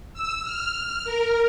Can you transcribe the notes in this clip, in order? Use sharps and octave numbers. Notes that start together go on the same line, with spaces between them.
E6
F6
A#4